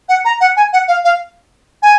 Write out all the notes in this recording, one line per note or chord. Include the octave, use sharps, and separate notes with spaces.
F#5
A#5
F#5
G#5
F#5
F5
F5
G#5